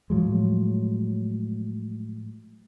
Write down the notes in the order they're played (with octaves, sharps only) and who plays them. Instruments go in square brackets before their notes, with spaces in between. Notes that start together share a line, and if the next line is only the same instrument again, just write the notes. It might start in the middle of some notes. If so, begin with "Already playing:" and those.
[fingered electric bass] A2 F3 F#3 G#3